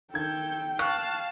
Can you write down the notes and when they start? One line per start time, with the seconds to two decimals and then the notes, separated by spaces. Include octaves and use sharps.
0.14 D#3 A4 G5 G6 G#6
0.79 F5 A5 C#6 F#6